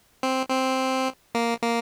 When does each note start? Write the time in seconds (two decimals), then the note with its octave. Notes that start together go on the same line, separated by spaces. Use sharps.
0.23 C4
0.50 C4
1.35 A#3
1.62 A#3